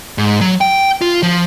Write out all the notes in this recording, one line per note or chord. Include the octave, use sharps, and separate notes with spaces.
G#2
F#3
G5
F4
F3